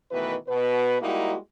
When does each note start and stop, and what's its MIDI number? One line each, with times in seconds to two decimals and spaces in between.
0.11 0.35 47
0.11 0.35 51
0.11 0.35 52
0.11 0.35 57
0.11 0.35 71
0.48 0.99 47
0.48 0.99 71
1.01 1.36 55
1.01 1.36 56
1.01 1.36 58
1.01 1.36 63
1.01 1.36 64
1.01 1.36 66